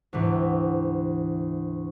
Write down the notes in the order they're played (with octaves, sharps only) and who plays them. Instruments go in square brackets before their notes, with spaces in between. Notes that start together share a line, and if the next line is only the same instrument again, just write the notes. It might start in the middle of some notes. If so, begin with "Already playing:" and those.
[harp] D2 G#2 C3 E3